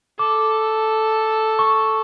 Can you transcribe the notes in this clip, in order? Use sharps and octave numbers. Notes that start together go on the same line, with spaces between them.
A4 D6
C#6